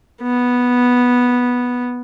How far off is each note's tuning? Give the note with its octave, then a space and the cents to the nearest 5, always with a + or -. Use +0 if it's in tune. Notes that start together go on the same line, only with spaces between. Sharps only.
B3 -5